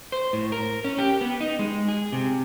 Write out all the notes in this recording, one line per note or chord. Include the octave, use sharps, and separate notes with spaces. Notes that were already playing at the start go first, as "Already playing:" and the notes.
C5
A2
A#4
C#4
G4
B3
D#4
G#3
G#4
C3